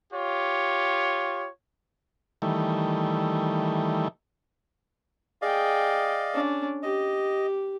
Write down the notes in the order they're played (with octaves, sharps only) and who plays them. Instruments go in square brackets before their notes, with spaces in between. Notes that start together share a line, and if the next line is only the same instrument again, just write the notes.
[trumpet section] F4 G4 C#5
[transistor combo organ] D#3 E3 G3 A3
[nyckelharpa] G#4 G5 [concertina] D5 D#5 F5
[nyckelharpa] C#4 D4
[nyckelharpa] G4 [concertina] D#5